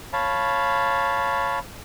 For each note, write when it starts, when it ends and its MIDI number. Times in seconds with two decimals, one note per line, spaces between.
0.13 1.59 73
0.13 1.59 77
0.13 1.59 81
0.13 1.59 83